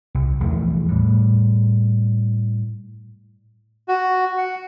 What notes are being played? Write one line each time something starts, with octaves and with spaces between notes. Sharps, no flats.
C2
A#1 E2 E3 A3
A2 G3
F#4
F#5